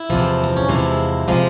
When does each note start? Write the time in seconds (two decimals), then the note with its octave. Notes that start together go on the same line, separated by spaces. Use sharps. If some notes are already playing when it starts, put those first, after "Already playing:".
Already playing: E4
0.10 E2 C3 F3 G#3
0.44 C4
0.57 C#4
0.69 E2 C3 F3 G#3 E4
1.28 C3 F3 G#3